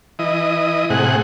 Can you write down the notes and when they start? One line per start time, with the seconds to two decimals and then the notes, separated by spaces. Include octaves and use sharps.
0.19 E3 D#5
0.90 A2 C3 G#4 F#5